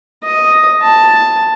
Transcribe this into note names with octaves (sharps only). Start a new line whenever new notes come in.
D#5
A5